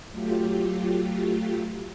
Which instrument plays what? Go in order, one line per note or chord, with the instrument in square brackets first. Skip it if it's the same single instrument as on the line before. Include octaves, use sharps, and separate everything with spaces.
[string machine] F#3 A3 F4 G4